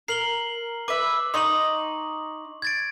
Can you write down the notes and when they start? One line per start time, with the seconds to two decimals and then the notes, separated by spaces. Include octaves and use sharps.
0.08 A#4 C7 F#7 G7
0.88 B4 E5 D6
1.34 D#4 D#5 C6 C#6 F#7
2.62 G#6 A6 D7